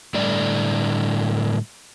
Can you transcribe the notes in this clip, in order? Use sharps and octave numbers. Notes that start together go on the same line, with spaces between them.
A2 D3 G3 D5